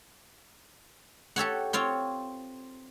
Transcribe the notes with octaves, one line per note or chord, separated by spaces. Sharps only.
G4 A4 C#5 F#5
C4 F4 C#5 G5